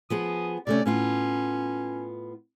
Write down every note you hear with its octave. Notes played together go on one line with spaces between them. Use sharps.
F3 B3 G#4 D#6
C3 A3 C#4 D5
A2 B3 C#4 F4